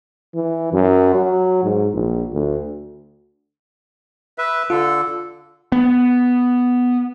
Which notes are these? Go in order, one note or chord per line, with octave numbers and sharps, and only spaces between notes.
E3
F#2
F#3
G#2
A#1
D2
B4 E5
D3 F4 A4
B3